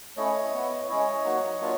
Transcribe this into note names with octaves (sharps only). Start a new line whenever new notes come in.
A3 C#4 E4 C#5 D#5
B3 E4
G#3 C#4 E4 C#5 D#5
F#3 A#3 D#4 F#4
F#3 A#3 D4 F4